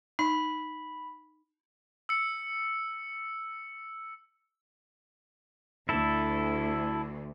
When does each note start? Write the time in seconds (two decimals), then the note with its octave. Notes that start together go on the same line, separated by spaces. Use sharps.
0.19 D#4 B5
2.09 E6 C#7
5.89 D2 E4 A4